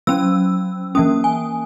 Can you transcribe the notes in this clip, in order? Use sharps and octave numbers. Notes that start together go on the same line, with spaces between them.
F#3 C#4 E6
E3 A#3 C#4 D#6
G#5